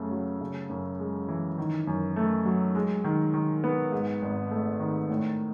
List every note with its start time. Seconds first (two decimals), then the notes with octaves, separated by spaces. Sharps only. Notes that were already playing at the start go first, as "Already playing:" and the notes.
Already playing: F#2 C#3 A3
0.11 F#3
0.41 C#3
0.69 F#2
0.99 G#3
1.28 E3
1.58 D#3
1.87 F#2
2.16 A3
2.45 F#3
2.75 G#3
3.04 D#3
3.34 D#3
3.64 B3
3.92 G#2
4.22 G#1
4.51 A3
4.80 D#3
5.09 A2